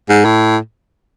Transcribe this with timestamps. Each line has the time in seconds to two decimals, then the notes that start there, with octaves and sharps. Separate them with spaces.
0.09 G#2
0.24 A2